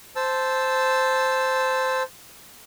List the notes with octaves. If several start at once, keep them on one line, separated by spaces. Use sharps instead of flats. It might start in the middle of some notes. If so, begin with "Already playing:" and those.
C5 A5 E6